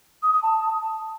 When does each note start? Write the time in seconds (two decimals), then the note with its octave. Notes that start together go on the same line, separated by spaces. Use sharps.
0.23 D#6
0.33 D#6
0.43 A5